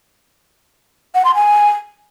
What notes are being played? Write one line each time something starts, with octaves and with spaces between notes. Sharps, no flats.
F#5
C6
G#5